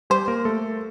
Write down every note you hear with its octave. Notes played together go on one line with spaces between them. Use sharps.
G3 G4 C5
A#3 A#4
A3 A4